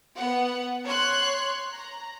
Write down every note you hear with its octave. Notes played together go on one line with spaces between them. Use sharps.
B3 F#5
C#5 C6 F#6
A#5